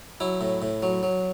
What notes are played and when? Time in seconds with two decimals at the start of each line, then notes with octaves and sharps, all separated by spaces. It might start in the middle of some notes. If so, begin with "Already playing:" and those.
0.20 F#3 E4
0.41 A2
0.62 A2
0.82 F#3
1.03 F#3